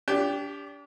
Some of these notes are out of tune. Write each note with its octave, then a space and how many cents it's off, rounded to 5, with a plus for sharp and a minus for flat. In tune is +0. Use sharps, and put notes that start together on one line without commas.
D4 -35 G4 +10